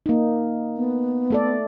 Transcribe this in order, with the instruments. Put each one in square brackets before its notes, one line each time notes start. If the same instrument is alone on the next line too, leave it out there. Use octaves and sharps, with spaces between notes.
[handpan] A#3 D#4
[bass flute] B3
[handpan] A3 A4 D5